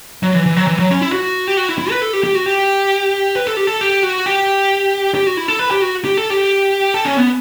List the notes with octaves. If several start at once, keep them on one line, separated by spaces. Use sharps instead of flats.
F#3
E3
E3
F#3
E3
F#3
C#4
E4
F#4
G4
F#4
E4
E4
B4
A4
G4
G4
F#4
G4
B4
A4
G4
A4
G4
F#4
G4
G4
F#4
E4
A4
B4
G4
F#4
G4
A4
G4
A4
C#4
B3